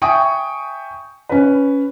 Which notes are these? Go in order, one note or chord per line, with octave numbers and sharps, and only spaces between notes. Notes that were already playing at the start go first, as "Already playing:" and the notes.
E5 G5 G#5 C#6 D#6
C#4 B4